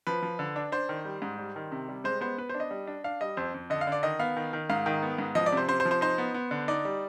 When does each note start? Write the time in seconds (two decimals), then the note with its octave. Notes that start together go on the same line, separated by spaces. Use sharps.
0.07 F3 B4
0.22 F3
0.39 D3
0.56 D4
0.72 D4 C5
0.89 D#3
1.05 G3
1.22 G#2
1.38 G3
1.56 D#3
1.72 C3
1.89 G3
2.04 G#3 C5
2.21 B3 C5
2.38 B3 B4
2.49 D4 C5
2.60 D#5
2.71 G3
2.87 D4
3.04 D4 F5
3.21 G3 D#5
3.37 F2 C5
3.54 F2
3.70 D3 D#5
3.81 F5
3.87 D3 D5
4.03 D#3 D#5
4.19 B3 F5
4.36 D#3
4.53 D#3
4.70 G#2 F5
4.86 D#3
5.02 B3
5.18 G#2
5.35 F3 D#5
5.46 D5
5.52 C3 C5
5.68 C3 C5
5.80 C5
5.85 F3
5.91 C5
6.01 D#4 C5
6.18 B3
6.34 B3
6.51 D3
6.68 D#4 D5
6.85 G3